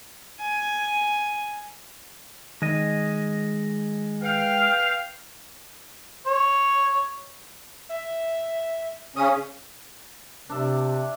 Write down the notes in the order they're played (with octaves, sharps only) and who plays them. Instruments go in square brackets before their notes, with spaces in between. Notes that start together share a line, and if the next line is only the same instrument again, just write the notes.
[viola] G#5
[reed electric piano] D#3 [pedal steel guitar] G#3 D#5
[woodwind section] B4 G5 [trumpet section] F5
[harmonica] C#5
[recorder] E5
[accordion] C#3 C#4 [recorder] D#6
[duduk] C3 [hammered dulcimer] D4 D5 E5